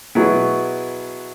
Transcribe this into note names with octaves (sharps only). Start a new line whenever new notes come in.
B2 F#3 B3 E4 G#4